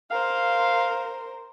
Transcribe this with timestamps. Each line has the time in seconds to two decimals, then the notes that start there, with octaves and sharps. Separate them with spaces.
0.11 A#4 C5 F5